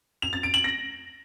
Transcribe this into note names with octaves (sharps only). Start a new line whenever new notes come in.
F7
A6
D7
F#7
A#6